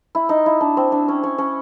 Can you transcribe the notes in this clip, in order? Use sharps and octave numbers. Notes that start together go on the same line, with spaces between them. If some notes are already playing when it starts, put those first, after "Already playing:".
E4
D#4
E4
D4
C4
D4
C#4
C#4
C#4